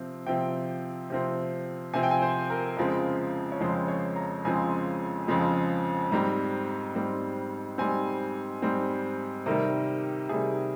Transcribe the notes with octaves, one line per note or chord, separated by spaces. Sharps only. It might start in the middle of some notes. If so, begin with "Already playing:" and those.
Already playing: C3 F3 C4
C3 F3 C4 G5
C3 F3 C4
C3 F3 C4 G#5
G5
G#5
C5
A#4
F2 C#3 F3 G#3 C4
C#5
F2 C#3 F3 G#3 C4 C5
C#5
A#5
F2 C#3 F3 G#3 C4 G#5
F2 C#3 F3 G#3 C4
G#2 G3 C4 A#5
G#2 G3 C4
G#2 G3 C4 G#5
G#2 G3 C4
C3 D#3 G3 A#4
C3 D#3 G3 G#4